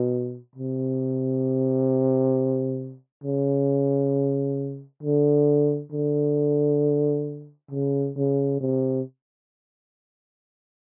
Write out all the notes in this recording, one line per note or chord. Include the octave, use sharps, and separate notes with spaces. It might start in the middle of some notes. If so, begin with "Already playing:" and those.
Already playing: B2
C3
C#3
D3
D3
C#3
C#3
C3